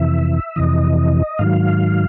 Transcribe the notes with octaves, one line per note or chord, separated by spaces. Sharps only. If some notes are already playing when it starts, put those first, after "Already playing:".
Already playing: F2 C3 E3 E5
F2 C3 E3 D#5
G#2 D#3 F#3 F5